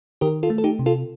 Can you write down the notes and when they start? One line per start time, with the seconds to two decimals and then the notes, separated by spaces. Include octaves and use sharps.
0.21 D#3 G4 A#4
0.43 F4 A4
0.50 A3
0.58 A4
0.64 D#4 G4
0.79 C3
0.86 F4 A4